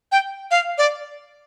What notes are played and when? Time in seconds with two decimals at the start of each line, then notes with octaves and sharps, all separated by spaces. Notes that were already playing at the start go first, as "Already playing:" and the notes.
0.12 G5
0.51 F5
0.78 D5